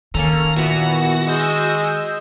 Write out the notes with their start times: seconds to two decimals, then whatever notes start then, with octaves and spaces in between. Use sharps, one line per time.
0.15 D#3 A#3 C#4 A4 A#5
0.57 A#2 E3 B3 E4 F#4
1.28 G#3 E6 G6